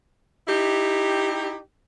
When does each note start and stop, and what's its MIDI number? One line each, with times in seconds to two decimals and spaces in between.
0.48 1.57 63
0.48 1.57 64
0.48 1.57 67